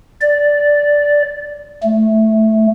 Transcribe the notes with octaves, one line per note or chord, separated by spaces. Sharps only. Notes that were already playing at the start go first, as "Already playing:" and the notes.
D5
A3